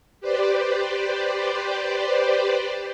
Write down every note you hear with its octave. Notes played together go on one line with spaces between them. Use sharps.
G4 B4 C5 D5